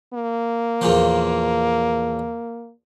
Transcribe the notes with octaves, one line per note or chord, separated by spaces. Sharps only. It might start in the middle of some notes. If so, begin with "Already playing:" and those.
A#3
E2 A#2 F3